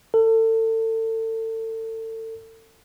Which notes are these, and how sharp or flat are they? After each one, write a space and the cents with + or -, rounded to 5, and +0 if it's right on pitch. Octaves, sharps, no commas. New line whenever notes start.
A4 +30